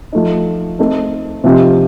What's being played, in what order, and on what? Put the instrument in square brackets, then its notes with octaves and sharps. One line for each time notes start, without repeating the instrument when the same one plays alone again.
[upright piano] F3 A3 D#4
A3 C4 D#4 A4
C3 F3 C4 D#4 G4